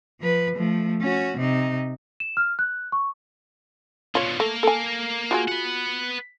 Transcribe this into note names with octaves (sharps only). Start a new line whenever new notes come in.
F3 B4
F3 A3
C#4 F#4
C3 D#4
E7
F6
F#6
C#6
B2 D3 F4 C#5
A3 A#3 A#4
A4 G#5
F4 F#4 G#4
B4 F#5